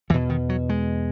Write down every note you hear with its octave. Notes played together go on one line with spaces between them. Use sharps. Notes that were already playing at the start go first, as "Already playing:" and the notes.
E2 B2 E3
D#3
F#3
G#3